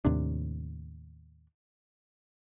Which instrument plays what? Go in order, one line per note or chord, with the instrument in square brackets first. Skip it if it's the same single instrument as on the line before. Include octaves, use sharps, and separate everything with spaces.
[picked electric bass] D#2 A2 C3 D4